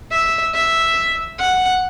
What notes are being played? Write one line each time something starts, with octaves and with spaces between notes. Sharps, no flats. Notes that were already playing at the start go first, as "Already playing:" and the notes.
E5
E5
F#5